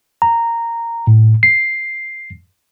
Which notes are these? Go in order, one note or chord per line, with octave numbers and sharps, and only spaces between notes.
A#5
A2
C7